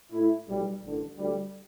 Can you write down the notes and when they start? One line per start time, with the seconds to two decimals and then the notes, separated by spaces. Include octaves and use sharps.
0.11 A2 A3 E4
0.47 B1 A2 G3
0.82 A1 G2 D3
1.17 D2 D3 G3